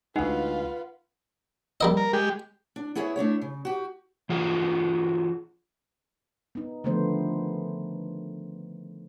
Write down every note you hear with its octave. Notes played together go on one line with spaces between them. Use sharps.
D2 G#3 D#4 F4 B4 F#5
G3 A#3 D#5
A#4
G#3 G4
D4
B3 E4 G#4 C#5 E5
A3 D4 E4 C#5
C#3
F#4 G4
E3 F4 F#4 G#4
B3 D#4
D3 D#3 F3 A3 B3 C5